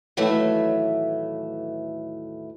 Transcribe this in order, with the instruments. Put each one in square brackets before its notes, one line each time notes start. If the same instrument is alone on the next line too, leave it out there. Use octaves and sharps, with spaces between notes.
[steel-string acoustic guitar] D#2 A2 E3 F#3 A3